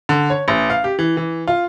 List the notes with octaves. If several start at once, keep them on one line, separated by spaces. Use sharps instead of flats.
D3
C#5
A1
F5
G4
E3
E3
F4